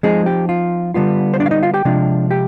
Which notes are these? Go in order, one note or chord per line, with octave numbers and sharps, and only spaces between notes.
F3 G#3 C4 D#4 G#4
G4
F4
D3 G3 B3 F4
C5
D4 D5
F5
D#4 D#5
F4 F5
G4 G5
C3 F3 G#3 D4 F4
G4 G5